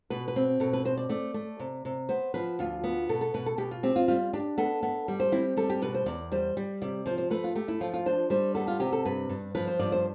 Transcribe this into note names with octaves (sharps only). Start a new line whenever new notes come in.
B2 B4
B4
C4
B2 A4
B4
C4 C5
D5
A3 D5
A3
C3
C3
B3 C5
F3 B4
D2 F4
B3
B2 A4
A4
B2 B4
A4
B2 G4
F4
C4 G4
F4
G3 F4
D4 G4
B3 A4
B3
G3
C5
C4 E4
G3 A4
G4
B2 B4
C5
E2 D5
G3 C5
G3
C3 D5
F3 C5
C5
A3 B4
F4
A3 G4
E4
F3 F4
F4
D4 C5
G3 C5
B3 A4
F4
C3 G4
A4
G2 B4
G2
F3 B4
C5
G2 D5
C5